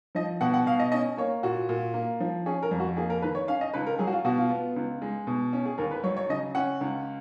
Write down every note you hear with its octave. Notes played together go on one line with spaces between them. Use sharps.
F3 D#5
B2 F#5
F#5
B2 F5
D#5
C#4 D#5
A#3 C#5
A#2 F#4
A#2
A#3
F3
C#4 G#4
A#4
F2
F#4
A#3 G#4
A#4
D#3 B4
C#5
C#4 F5
D#5
C#2 B4
A#4
F#3 G#4
F#4
F4
B2 F#4
F4
B3
C#2
G#3
B2
C#4
G#4
D#2 A#4
B4
F#3 C#5
C#5
C#3 D#5
C#4 F#5
C#2